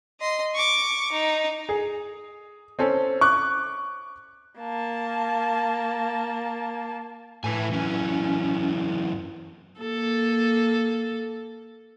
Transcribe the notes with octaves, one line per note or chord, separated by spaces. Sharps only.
D#5 C6
C#6 D6
D#4
G#4
C4 C#4 A4
C#6 D6 F#6
A#3 A5
A2 E4 B4 G#5
F#2 E3 C#4
A#3 A4